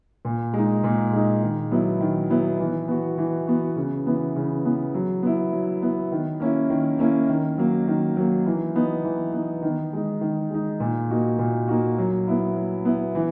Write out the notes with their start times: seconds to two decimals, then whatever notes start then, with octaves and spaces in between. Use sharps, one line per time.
0.25 A#2
0.53 G#3 D#4
0.84 A#2
1.13 G#3 D#4
1.43 D#3
1.71 F#3 B3 E4
2.01 D#3
2.30 F#3 B3 E4
2.60 E3
2.88 B3 F#4
3.18 E3
3.47 B3 F#4
3.76 C#3
4.06 E3 B3
4.36 C#3
4.65 E3 B3
4.94 F#3
5.23 B3 E4
5.53 F#3
5.82 B3 E4
6.12 D#3
6.40 A#3 C#4 E4
6.70 D#3
6.99 A#3 C#4 E4
7.29 D#3
7.58 F#3 A#3
7.88 D#3
8.17 F#3 A#3
8.46 E3
8.75 B3 D#4
9.04 E3
9.33 B3 D#4
9.63 D#3
9.93 G#3 D#4
10.21 D#3
10.51 G#3 D#4
10.80 A#2
11.10 A#3 D#4 F#4
11.39 A#2
11.68 A#3 D#4 F#4
11.98 F#3
12.28 B3 E4
12.56 F#3
12.85 B3 E4
13.15 E3